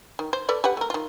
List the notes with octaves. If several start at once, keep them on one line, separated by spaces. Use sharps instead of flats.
D#3
C5
A4 B4 D5
G4 B4 F#5
A3 A#4
D#3 F4